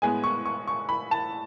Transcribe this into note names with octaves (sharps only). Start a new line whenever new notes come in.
A2 G#3 B3 G#5
C#6
C#6
C#6
B5
A5